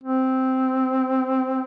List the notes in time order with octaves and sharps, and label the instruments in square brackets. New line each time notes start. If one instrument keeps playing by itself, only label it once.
[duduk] C4